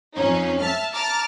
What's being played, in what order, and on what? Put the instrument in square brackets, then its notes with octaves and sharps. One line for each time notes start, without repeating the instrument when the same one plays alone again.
[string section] F2 C#4 D#4
E5 A5 F6
A5 A#5 D6 F6 A6